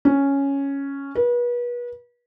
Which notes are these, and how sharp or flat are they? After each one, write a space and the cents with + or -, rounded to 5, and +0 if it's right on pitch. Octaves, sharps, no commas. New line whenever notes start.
C#4 +0
B4 -35